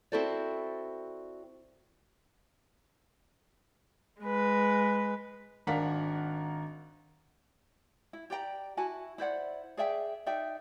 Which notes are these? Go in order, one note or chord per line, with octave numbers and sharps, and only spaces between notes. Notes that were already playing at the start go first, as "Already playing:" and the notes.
C4 E4 F#4 A4 C5 D5
G#3 B4
G#1 D4 A#4 F5 F#5 B6
E4
G4 D5 G5 A#5
E4 F#4 G#5 A5
E4 C5 D5 F#5
G#4 D5 E5 G5
D#4 D5 E5 G5